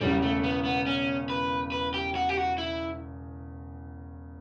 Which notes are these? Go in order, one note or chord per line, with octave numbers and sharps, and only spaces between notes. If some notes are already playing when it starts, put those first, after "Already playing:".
E1 E2 C#3 G3
A3
B3
B3
C#4
B4
B4
G4
F#4
G4
F#4
E4